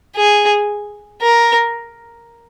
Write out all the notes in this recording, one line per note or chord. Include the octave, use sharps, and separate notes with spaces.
G#4
A#4